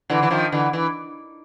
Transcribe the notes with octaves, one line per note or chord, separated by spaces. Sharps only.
D3 E3
E3
D#3 F3
D3 E3
E3